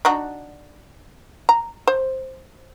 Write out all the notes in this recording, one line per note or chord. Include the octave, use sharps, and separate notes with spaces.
D4 D#4 F#4
A#5
C5